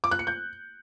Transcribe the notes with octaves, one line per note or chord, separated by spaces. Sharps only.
D6
F#6
C#7
G6